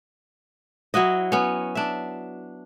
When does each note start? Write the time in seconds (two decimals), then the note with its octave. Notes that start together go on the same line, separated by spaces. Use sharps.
0.94 F#3 E4 F#4 D#5
1.32 B3 C#4
1.75 D4 E5